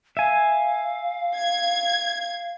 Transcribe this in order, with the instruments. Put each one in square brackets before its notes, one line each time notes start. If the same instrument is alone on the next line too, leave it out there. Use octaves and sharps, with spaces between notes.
[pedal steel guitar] E5 G#5 [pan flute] F5
[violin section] G#6